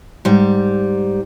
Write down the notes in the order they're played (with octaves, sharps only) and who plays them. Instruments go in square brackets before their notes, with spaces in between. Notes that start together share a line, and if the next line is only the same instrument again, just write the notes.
[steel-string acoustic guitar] G#2 G3